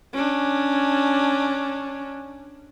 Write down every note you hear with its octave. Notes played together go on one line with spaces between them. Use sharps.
C#4 D4